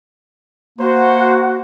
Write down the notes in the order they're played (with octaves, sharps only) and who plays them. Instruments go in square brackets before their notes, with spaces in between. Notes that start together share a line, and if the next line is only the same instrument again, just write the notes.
[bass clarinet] A#3 [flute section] F#4 [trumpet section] C5